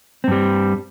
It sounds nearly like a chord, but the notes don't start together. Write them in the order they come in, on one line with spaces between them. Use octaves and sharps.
C4 G2 G3